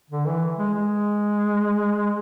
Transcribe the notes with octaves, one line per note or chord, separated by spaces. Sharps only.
D3
E3
G#3
G#3